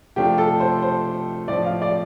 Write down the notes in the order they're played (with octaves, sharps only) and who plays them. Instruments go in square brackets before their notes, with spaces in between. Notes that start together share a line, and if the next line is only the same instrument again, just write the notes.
[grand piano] C3 F3 A3 D4 F4 [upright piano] G4
[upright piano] A4
C5
C5
[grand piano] A2 F3 C4 [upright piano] D5
[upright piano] F5
D5